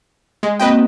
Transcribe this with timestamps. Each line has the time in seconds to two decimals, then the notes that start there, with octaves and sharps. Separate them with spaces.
0.43 G#3
0.60 A#3 C4 F#4 B4 D#5 G5